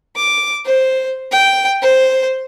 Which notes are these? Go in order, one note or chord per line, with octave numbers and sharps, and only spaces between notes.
D6
C5
G5
C5